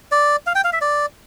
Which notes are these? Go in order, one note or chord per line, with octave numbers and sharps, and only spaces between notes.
D5
F5
G5
F5
E5
D5